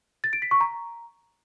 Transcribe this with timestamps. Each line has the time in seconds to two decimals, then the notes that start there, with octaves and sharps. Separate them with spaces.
0.24 A6
0.33 D7
0.42 B6
0.51 C#6
0.61 A#5